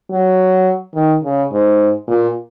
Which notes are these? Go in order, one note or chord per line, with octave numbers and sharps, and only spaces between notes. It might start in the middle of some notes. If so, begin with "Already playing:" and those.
F#3
D#3
C#3
G#2
A#2